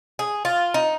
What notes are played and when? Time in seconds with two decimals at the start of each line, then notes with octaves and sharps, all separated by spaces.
0.19 G#4
0.45 F4
0.74 D#4